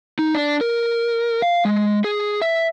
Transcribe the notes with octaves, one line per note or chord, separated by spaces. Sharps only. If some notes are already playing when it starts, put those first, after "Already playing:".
D#4
D4
A#4
F5
G#3
G#4
E5